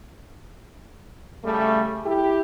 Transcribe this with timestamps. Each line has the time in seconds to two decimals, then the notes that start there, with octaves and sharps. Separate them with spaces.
1.45 C#3 G3 A3
2.06 E4 G4